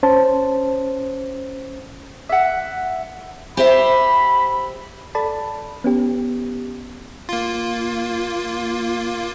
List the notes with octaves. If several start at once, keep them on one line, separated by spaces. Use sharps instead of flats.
C#4 C5 A5
E5 F#5
G4 C5 E5 B5
A4 D5 A5 B5
B3 C#4 G4
A#3 F4